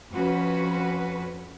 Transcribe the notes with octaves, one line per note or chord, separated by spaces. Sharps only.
F2 F3 C#4 F#4 B4